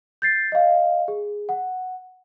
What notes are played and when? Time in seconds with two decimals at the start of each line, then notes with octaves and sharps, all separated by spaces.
0.22 G6 A6 C7
0.52 D#5 F5
1.08 G#4
1.49 F#5